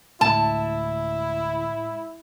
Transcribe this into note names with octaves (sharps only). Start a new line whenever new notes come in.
D2 A2 G#3 E4 A5